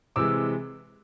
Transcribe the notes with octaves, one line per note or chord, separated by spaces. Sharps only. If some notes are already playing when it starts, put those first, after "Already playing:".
C3 E3 G#3 D6 E6